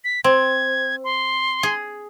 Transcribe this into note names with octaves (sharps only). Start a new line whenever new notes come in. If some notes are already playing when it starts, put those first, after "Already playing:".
B6
C4 G#6
C6
G#4